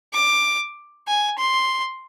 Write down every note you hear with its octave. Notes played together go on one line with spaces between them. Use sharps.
D6
G#5
C6